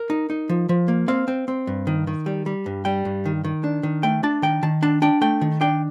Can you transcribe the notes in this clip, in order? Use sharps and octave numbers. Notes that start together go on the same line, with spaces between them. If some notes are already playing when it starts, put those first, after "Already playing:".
Already playing: A#4
D#4
D#4
F3
F3
A#3
C4 F5
C4
C4
G2
D#3
D#3
G3
G3
G2
G3 G5
G2
D#3
D#3
D4
D#3
A3 G5
D4 A5
D#3 G5
D#3 A5
D4 A5
D4 G5
A3 G5
D#3
D4 G5